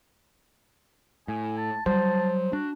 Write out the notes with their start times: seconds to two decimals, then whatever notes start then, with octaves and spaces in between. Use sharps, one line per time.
1.28 A2 G#5
1.58 A5
1.86 F#3 G3 C5 A5
2.53 D4 F#4